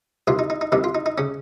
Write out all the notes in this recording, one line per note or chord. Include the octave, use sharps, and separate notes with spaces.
C2 C3 D#3 F4
D#4
D#4
D#4
C2 C3 D#3 D#4
F4
D#4
D#4
C#3 C#4